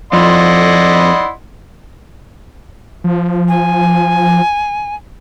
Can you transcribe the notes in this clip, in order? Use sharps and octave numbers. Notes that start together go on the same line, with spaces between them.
F2 E4 D5 D#5 F#5 C6
F3
G#5